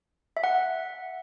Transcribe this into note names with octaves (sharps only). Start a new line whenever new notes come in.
E5
F#5